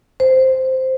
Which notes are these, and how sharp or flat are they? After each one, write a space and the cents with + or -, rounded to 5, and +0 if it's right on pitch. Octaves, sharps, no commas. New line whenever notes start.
C5 -5